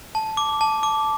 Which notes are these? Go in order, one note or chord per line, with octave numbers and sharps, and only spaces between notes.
A5
D6
A5
D6